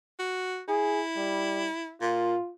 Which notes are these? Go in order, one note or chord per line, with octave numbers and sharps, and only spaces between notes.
F#4
E4 G#4
G3
A#2 F4